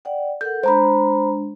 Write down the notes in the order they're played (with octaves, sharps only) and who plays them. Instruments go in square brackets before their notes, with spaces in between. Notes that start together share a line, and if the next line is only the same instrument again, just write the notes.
[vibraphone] D5 F#5 G5
[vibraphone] A4 A#4 F#5 [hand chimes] G6
[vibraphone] G#3 D4 [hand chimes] C5 A#5 B5